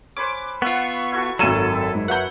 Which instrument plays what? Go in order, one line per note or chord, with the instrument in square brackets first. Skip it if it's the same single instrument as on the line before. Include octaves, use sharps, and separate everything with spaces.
[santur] C#4 B4 C5 [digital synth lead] D6
[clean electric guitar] B3 F4 [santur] B4 E5 F#5 [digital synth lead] C#6
[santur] E4 F#4 A4
[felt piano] G#1 D#7 E7 [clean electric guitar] F#2 F#3 [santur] E4 [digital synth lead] A4
[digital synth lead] G#2
[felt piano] B4 E5 G6 [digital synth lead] F#5